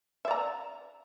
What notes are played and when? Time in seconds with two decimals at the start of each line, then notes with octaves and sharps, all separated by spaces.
0.25 E5
0.28 D5
0.31 A#5